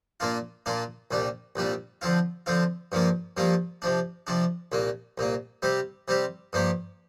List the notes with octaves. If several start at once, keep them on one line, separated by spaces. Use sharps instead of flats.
A#2 A#3 D4 F4
A#2 A#3 D4 F4
C2 A#2 G3 D4
C2 A#2 G3 D4
D3 F3 C4 F4
D3 F3 C4 F4
G2 F3 A#3 F4
G2 F3 A#3 F4
C3 F3 D4
C3 F3 D4
C2 A#2 A#3
C2 A#2 A#3
C3 G3 C4 G4
C3 G3 C4 G4
G2 F3 A#3 G4